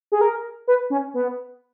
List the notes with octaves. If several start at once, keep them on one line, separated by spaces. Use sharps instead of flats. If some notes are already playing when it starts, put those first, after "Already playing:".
G#4
A#4
B4
C#4
B3